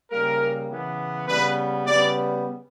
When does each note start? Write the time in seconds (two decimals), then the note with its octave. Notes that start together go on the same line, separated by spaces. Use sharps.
0.11 C#3 G3 A#3 A#4
0.70 C#3 E3 B3
1.28 C#3 G3 B3 B4
1.87 C#3 G3 B3 D5